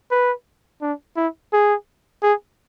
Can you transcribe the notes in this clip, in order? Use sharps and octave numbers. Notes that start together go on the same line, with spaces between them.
B4
D4
E4
G#4
G#4